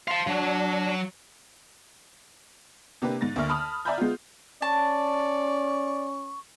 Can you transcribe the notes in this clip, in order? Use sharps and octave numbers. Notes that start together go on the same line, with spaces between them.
F5 A5 C6
F#3 D4
C3 A#3 D4 G4 B4
G#2 A6 A#6
D2 A#3 E5 C#6 F6
A5 B5 D#6 F6
D5 E5 G#5 A#5 B5 G6
G#3 B3 F4
C#4 D5 A5 C#6